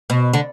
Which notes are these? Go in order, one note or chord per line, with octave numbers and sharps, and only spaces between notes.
B2
D3